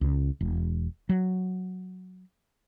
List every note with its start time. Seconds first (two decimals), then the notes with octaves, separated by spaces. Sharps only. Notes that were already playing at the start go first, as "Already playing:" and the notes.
0.01 C#2
0.41 E1
1.09 F#3